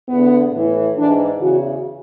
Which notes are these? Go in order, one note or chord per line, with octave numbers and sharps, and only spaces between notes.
E2 D3 B3
A2 E3
G#2 E3 D4
E2 C#3 E3 F#4